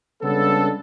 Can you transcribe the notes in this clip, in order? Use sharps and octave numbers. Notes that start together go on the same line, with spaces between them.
C#3 G3 G#3 B3 D4 A4